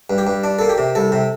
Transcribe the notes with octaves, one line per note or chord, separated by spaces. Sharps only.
G2
G4
G2
D4
A#3 A4
G4
C3
C2 A4
C3